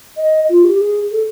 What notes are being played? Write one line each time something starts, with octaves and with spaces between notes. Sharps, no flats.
D#5
F4
G4
G#4
A4